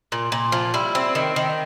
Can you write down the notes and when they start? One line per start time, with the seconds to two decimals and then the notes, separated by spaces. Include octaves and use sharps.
0.12 A#2
0.32 A#2
0.52 F3
0.74 G3 E4
0.95 C4
1.15 D#3
1.36 D#3